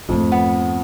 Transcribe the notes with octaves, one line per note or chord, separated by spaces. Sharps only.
F2 G#2 A3
B3